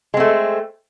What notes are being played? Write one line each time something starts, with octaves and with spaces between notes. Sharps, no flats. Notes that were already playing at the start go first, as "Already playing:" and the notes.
G#3 A3 C4